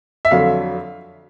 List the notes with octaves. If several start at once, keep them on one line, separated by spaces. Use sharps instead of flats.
E5
F2 D3 F#3 F5